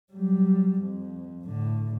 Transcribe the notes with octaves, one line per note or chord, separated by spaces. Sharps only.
F#3 G3
F2
A2 D3